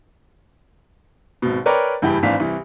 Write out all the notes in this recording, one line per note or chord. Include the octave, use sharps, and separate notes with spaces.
G#1 B2
A#4 B4 C#5 D5 G5 A#5
F#1 G2 E3 E4 G4 G5
G#1 G#2 E3 D4 F5 B6
C2 E3